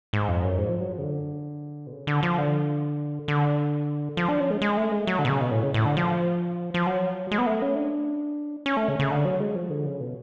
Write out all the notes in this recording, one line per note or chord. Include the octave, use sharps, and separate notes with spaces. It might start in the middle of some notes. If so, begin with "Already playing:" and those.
G#2
F2
F#2
G#2
F3
F#3
F3
C#3
D3
B2
C#3
D3
F3
D3
D3
F3
D4
C#4
G#3
G#3
A3
G#3
F#3
D3
B2
C#3
B2
A2
C#3
A2
D3
F3
F3
F#3
G#3
B3
A3
C#4
D4
C#4
A3
C#3
C#3
D3
F#3
G#3
F3
D3
C#3
B2